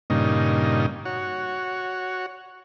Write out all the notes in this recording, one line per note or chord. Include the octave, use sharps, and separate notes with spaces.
G2 A#2 C#3 D#4
F#4 C#5